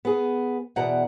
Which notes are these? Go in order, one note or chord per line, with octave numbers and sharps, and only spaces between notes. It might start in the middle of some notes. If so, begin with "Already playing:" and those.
B3 G#4
E2 B2 D5 E5 F#5 A#5